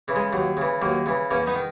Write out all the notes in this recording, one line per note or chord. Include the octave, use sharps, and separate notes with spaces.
C#3 E3
G#3
D#2 F#3
C#3 E3
D#2 F#3 A#3
C#3 E3
E2 A#3 C#4
B3 D#4
D#3